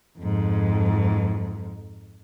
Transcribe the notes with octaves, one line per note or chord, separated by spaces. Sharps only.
F2 G#2